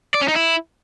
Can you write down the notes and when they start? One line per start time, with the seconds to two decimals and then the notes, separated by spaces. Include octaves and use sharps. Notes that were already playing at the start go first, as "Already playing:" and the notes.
0.14 D5
0.21 C#4
0.28 D#4
0.35 E4